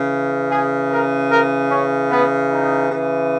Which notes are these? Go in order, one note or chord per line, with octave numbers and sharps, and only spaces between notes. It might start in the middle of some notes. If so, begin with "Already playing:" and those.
Already playing: C#3 E3
G#4
A#4
A#4
C#4
B3
D#4
C#3 E3